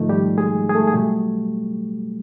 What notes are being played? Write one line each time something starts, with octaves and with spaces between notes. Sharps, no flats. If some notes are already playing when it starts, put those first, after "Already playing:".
Already playing: G#2 D#3 F3 A3 D#4
G3 G4
G#3 G#4
G#4
A3 A4
G#4
B2 F#3 G3 A3 G4